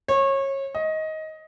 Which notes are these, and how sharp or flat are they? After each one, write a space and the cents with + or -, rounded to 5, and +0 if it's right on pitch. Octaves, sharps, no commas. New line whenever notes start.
C#5 -25
D#5 +15